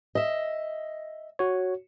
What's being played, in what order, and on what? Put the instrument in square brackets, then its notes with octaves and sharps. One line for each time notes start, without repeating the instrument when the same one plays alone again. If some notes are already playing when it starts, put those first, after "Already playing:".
[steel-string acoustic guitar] D#5 E5
[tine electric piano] F#4 C#5